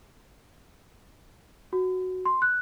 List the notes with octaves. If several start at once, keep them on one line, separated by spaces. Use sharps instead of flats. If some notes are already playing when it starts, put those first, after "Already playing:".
F#4
C6
F#6